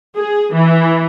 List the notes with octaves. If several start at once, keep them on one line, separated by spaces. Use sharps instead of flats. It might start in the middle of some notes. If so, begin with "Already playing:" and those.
G#4
E3